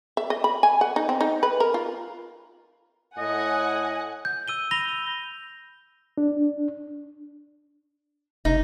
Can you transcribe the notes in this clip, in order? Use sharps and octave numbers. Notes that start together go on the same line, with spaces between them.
E5
D#5
B5
G#5
F#5
D#4
C4
D#4
B4
A#4
F4
A2 D#5 F#5 G#5
G6
E6 D#7 G7
B5 A#6 F7 G7
D4
F1 D#4